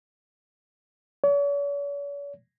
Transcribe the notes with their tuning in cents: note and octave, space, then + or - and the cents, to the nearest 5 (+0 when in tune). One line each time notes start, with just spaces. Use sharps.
C#5 +45